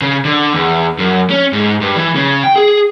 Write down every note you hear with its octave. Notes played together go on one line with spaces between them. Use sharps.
C#3
D3
E2
F#2
C#4
G#2
G2
E3
C#3
G5
G#4